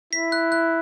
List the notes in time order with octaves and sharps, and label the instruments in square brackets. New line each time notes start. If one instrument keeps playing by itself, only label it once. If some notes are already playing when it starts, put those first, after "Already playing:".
[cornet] E4 [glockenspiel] B6
[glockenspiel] F#6
F#6